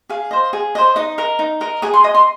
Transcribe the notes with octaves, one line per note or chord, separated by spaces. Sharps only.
G#4 F5
C5 D#5
G#4
C5 D#5
D#4 D#5
A#4 D#5
D#4
A#4 D#5
G#4 D#6
C6
D#5 D#6
C6